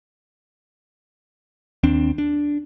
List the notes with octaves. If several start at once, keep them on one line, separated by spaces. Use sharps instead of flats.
D#2 C4 D4
D4